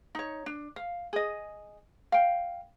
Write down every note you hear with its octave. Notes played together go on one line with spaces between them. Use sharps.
D#4 C#5
D4
F5
G#4 D#5
F5 G5